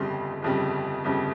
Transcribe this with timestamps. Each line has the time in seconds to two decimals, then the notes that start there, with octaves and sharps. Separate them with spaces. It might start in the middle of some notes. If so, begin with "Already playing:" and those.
Already playing: G1 F2 C#3 G3 C6
0.42 G1 F2 C#3 G3
1.04 G1 F2 C#3 G3